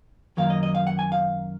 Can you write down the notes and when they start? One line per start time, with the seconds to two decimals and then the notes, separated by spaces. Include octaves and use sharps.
0.37 F#2 D#3 F#3 A#3 F5
0.50 D#5
0.63 D#5
0.75 F5
0.87 F#5
0.99 G#5
1.12 F5